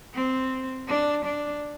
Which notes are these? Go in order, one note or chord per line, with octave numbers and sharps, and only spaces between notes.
C4
D4
D4